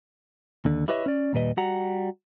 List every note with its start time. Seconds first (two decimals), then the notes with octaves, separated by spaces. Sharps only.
0.65 D#2 D3
0.88 E4 G4 B4 C#5 D#5 E5
1.06 C#4 D5
1.33 D#2 A#2 G3 B4 D#5
1.57 G3 F#4 F#5 A#5